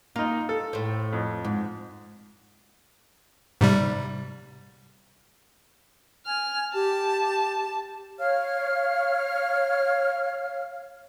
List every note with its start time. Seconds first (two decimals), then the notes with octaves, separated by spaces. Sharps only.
0.16 A#3 D#4 F4
0.49 A4
0.73 A2 C5
1.13 F2
1.45 G#2
3.61 G#2 C3 G3
6.26 G#5 F6
6.73 G4 A5
8.19 C#5 F5 F6